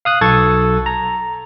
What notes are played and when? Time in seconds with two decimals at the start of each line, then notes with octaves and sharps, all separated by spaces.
0.05 F5 D#6 F#6
0.21 B1 A4 C#6 G#6 A6
0.86 A#5